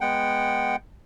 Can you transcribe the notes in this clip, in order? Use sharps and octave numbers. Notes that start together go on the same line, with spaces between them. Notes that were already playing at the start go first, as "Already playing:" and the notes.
G#3 B3 F#5 G5